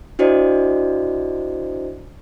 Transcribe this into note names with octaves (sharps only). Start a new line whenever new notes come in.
D4 E4 F#4 C5 D5 D#5